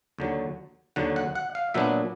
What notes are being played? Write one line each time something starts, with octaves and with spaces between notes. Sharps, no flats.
D#2 D3 F#3
D#2 D3 F#3 F#5
F#5
F#5
F5
A#2 F#3 B3 D4 E5